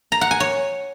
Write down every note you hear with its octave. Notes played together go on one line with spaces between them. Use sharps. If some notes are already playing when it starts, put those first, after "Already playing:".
A#5
F#5
G#5
C#5